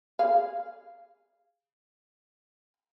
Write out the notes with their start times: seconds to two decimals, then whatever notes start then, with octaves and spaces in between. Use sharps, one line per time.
0.19 G#4 F5